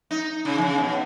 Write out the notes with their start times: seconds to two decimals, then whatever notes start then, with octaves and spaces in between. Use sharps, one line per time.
0.11 D#4
0.45 C#3
0.58 D#3
0.62 C#3
0.78 B2